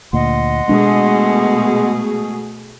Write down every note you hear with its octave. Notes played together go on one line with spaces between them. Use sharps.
D2 A#2 D#5 F#5 C6
B2 G#3 A3 D4 G#4